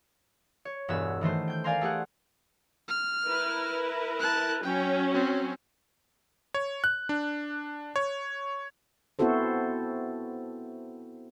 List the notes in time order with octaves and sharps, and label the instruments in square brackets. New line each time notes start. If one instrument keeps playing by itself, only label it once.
[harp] C#5
E1 G2 B3 G#4 E6
D#3 E3 A3 C5
G5 G6
A#4 D5 F5 G#5 A#5 C6
A3 G4 G#4 F#5
[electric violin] F6
[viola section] E4 A#4 B4
[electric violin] A5 F#6
[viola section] F#3 C#4 [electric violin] G5
[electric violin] C4
[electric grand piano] C#5
F#6
D4
C#5
[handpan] B3 C4 E4 F#4 A4 C5